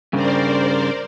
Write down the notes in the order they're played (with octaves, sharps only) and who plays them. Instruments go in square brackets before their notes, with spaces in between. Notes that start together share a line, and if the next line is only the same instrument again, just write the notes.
[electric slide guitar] G2 C#3 [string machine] A#4 C5 D5